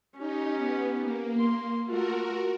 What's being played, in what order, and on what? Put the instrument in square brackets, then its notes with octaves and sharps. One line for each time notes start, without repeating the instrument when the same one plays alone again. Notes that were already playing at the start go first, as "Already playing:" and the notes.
[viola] C#4 G4 [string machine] D#4
[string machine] B3
A#3
[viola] C6
[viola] A3 F4 [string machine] F#4 A#4